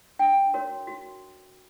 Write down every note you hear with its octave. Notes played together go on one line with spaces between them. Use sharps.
D4 G5
F#4 A#4 C#5
F#4